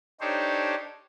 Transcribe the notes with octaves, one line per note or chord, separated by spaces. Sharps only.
D4 D#4 G4 A4 C5 C#5